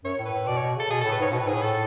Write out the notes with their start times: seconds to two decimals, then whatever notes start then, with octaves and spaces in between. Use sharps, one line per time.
0.04 F#2 C#5
0.19 A2
0.25 B4
0.32 A2
0.47 B2 D5
0.58 B2 C#5
0.76 C#3 A4
0.90 B2 G#4
1.01 A2 A4
1.12 B4
1.19 G#2 C#5
1.32 B2 B4
1.40 A2
1.47 G#2 G#4
1.54 A2
1.62 A4